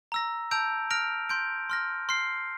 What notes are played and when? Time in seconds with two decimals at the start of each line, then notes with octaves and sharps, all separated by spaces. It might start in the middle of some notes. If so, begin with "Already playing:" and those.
0.12 A#5 E6 A#6
0.51 A5 E6 G6 D7 F7
0.90 F6 A#6 D7 F7
1.29 C6 G6 D7
1.70 C6 F6 A#6
2.09 C6 F6 C7